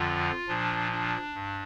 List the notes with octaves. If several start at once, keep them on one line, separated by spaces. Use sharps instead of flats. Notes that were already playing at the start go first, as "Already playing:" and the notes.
Already playing: F2 D3 F3 F4
A#2 F3 D4
D4
G2